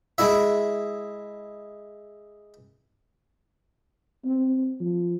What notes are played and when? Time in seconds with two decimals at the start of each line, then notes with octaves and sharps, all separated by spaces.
0.18 G#3 E4 E5
4.25 C4
4.80 F3